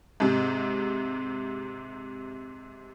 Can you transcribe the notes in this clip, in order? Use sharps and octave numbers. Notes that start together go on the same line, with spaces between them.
G#2 C3